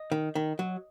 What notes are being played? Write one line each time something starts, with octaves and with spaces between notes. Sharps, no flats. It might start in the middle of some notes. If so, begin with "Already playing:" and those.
Already playing: D#5
D#3
D#3
F#3